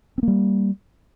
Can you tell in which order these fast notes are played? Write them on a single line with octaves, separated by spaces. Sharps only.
C4 A#3 G3